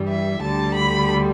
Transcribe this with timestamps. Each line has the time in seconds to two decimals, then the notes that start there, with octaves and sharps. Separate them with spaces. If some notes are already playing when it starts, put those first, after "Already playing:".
Already playing: G2 E3 G3
0.09 E5
0.42 D2 D3 G3 A5
0.75 B5